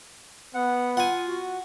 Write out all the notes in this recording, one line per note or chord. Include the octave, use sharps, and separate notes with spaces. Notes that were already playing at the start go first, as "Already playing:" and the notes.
B3 F#5
F4 F#5 G#5
F#4